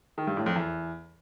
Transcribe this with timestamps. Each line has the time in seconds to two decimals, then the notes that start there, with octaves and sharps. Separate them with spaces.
0.18 D#3
0.27 G2
0.37 A2
0.46 F2
0.56 E2